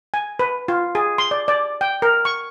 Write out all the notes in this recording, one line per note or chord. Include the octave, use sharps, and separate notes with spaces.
G#5
B4
F4
G#4
C6
D5
D5
G5
A#4
C#6